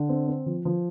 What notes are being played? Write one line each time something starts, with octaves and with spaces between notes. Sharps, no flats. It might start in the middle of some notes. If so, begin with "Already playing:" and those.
Already playing: D3
C4
C4
F3
F3